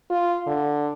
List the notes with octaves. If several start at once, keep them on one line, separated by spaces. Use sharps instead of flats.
F4
D3